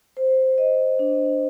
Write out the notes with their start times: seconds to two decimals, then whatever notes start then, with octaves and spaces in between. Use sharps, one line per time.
0.17 C5
0.58 D#5
0.99 D4